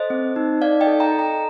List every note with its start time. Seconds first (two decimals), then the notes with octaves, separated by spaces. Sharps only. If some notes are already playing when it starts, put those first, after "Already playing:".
Already playing: A4 C5 D#5
0.10 C4
0.36 D#4
0.61 D#4 D5 F5
0.81 D#5 G5
0.87 A4
1.00 G5 A#5
1.12 A4
1.19 G5 A#5